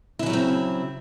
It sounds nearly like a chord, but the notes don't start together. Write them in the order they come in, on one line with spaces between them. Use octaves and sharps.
E4 E3 F#3 C#3 C4